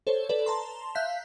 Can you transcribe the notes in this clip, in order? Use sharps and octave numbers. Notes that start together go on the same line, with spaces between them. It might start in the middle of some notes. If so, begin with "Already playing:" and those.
A4 C5 C#5
A4 B4 D5
A5 A#5 C6
E5 F5 F#6 G6 B6